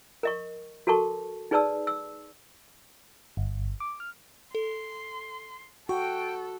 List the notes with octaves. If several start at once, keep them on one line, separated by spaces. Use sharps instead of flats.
A#4 D#5 C#6
F#4 A4 A#4 A5 C#6
D#4 G#4 B4 D5 A5 E6
E6
G1
D6
F6
A4 C6
F#4 A4 G5 C#6